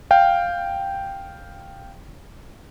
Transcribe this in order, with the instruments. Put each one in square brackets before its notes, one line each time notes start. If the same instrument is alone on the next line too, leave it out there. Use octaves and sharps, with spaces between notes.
[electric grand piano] F5 G5